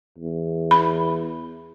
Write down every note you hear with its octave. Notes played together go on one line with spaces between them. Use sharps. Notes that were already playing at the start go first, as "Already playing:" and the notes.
E2
B5